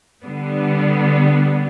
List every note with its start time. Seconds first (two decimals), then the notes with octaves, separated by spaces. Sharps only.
0.24 D3 G3 B3